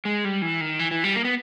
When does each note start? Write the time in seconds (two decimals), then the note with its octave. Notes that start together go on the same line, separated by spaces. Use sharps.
0.05 G#3
0.25 G3
0.42 E3
0.61 D#3
0.79 E3
0.91 E3
1.04 G3
1.16 A#3
1.25 B3